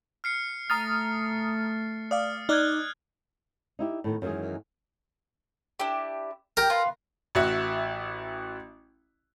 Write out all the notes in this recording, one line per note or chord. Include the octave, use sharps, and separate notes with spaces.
F6 C7 C#7
A3 A#5 D#6 F6 A6 C7
D5 F5 D#6 F6
D#4 D5 F6 F#6 G#6
D#4 E4 G4
A2 D#3 B3
F#2 D#3 E3 G#3 G#4
D4 E4 G4
G4 A#4 G5
F4 B4
A1 F#4 E5